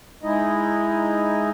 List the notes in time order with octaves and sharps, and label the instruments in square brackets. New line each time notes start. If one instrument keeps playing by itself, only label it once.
[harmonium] G#3 D#4 E4 D#5